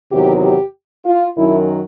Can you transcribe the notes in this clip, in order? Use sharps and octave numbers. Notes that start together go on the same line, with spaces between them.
E2 C3 D#3 F#3 G4
G4
F4
F#2 D#3 F#3 E4